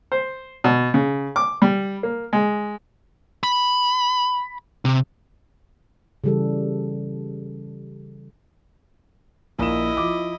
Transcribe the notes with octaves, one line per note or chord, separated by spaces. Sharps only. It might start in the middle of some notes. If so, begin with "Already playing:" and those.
C5
B2
C#3
D6
G3
A#3
G#3
B5
C3
C#3 E3 G3 G4 A4
A#1 E4 A#4 D#5 E7
F3 D6